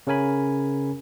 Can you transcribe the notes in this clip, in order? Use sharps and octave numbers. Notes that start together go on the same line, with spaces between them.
C#3 C#4 A#4 G#5 B5